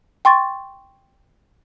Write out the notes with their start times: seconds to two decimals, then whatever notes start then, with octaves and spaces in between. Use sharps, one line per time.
0.25 G5 C6 C#6 A6